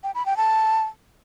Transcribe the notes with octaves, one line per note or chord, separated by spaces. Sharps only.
G5
B5
G5
A5